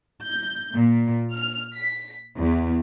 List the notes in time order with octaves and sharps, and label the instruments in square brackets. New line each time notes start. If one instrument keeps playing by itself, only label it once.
[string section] G6
A#2
F6
B6
E2